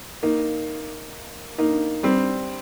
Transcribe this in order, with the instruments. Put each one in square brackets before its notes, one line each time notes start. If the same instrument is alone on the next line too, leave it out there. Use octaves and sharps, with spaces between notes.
[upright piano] A#3 D#4
A#3 D#4
G3 C4